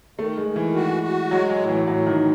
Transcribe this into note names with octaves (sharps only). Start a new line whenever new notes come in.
D#3 A3
G#3
D#3
E3
F#4
F#4
F#3 G#3
F#3
A2
E3
A2 F#3
D#3
A2